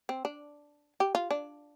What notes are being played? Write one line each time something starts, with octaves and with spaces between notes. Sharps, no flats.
C4
D4
G4
F4
D4